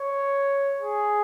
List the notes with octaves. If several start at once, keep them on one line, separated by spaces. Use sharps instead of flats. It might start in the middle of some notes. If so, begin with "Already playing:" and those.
Already playing: C#5
G#4